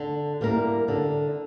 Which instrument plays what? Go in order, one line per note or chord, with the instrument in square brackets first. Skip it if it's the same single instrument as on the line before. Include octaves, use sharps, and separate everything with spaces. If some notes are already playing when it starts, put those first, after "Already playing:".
Already playing: [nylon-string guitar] D3
G3 A#3 E4 A#4
D3